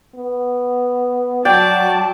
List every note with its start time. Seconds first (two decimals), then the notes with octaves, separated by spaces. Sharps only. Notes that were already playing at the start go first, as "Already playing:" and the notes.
0.15 B3
1.45 F#3 F#4 D5 G5 A5